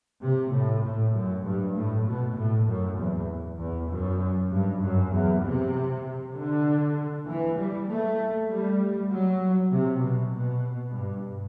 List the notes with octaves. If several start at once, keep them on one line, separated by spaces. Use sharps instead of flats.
C3
A2
A2
F#2
G2
A2
B2
A2
F#2
E2
E2
F#2
G2
F#2
E2
C3
D3
E3
G3
A3
G3
F#3
C3
B2
B2
G2